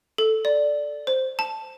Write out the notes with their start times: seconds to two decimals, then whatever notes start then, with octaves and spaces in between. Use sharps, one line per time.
0.18 A4
0.45 D5
1.07 C5
1.39 A5